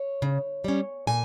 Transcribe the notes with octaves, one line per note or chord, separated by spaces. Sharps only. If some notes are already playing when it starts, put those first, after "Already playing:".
Already playing: C#5
C#3
G3 C#4
A#2 G#5